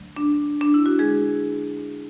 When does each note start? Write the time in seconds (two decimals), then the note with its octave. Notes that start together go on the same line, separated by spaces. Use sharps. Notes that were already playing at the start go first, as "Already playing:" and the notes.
Already playing: D2 D3 F#3 A3
0.16 D4
0.61 D4
0.74 E4
0.86 F#4
0.99 D3 G#3 G#4